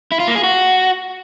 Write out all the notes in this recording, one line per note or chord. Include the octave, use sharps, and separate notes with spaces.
E4
F4
A#3
G#4
F#4